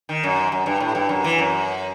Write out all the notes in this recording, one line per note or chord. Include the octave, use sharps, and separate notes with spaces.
D#3
F#2
F#2
G2
A2
G2
F#2
E3
F#2